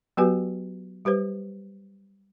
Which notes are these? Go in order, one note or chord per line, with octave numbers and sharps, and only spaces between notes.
F#3 B3 F#4 G4 B4 G#5
G3 G4 B4 C5